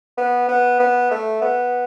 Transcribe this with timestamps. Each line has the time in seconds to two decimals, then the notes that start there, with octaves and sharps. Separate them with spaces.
0.17 B3
0.48 B3
0.80 B3
1.11 A3
1.42 B3